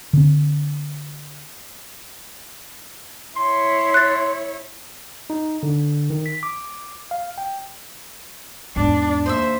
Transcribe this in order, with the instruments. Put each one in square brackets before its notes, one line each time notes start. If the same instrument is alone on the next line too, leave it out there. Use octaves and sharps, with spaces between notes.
[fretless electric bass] D3 C4
[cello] E4 C#5 [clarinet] C6
[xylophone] F#6 A6
[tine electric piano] D#4
D3
D#3
B6
D6
F5
G5
[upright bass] E2 G#2 [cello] D4
[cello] D#2 [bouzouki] C5 D#5 E5